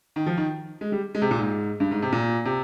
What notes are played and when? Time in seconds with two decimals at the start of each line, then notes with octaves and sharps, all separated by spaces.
0.16 D#3
0.26 F3
0.37 D#3
0.81 G#3
0.92 G3
1.15 G#3
1.22 C3
1.31 A#2
1.39 G#2
1.80 G2
1.91 G#2
2.02 C3
2.12 A#2
2.45 C3